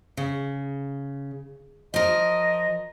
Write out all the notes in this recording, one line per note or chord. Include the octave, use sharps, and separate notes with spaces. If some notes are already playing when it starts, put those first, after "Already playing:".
C#3
F3 A#4 D#5